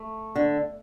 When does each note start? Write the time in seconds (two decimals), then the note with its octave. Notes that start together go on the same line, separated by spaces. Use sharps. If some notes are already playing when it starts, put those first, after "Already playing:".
Already playing: A3
0.36 D3